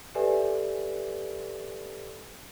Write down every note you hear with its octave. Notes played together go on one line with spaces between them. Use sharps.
G4 A4 B4 D5 E5 G#5